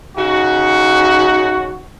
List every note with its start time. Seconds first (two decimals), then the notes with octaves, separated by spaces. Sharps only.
0.17 C#3 D#4 F#4